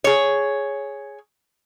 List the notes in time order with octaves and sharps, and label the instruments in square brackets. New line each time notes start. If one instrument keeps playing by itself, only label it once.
[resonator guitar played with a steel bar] G#4 C#5